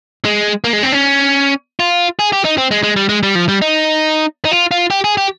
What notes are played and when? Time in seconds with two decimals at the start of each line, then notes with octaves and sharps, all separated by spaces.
0.25 G#3
0.64 A#3
0.73 G#3
0.83 C4
0.92 C#4
1.80 F4
2.19 G#4
2.33 G4
2.45 D#4
2.58 C4
2.71 G#3
2.83 G#3
2.96 G3
3.09 G#3
3.23 G3
3.35 F3
3.49 G3
3.62 D#4
4.45 D#4
4.52 F4
4.71 F4
4.90 G4
5.04 G#4
5.17 G4